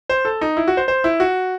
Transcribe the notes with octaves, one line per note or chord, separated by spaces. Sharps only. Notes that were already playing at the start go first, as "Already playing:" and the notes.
C5
A4
D#4
E4
F#4
C5
C5
E4
F#4